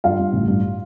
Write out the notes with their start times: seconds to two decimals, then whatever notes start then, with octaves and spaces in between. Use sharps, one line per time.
0.04 G2 F4 F5
0.19 G2
0.33 A1
0.48 G2